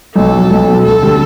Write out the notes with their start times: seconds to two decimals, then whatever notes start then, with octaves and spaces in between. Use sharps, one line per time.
0.15 B1 A4
0.32 B2
0.37 F#3
0.50 B1
0.68 B2 F#3
0.85 D2 A4
1.02 D3 G3 D4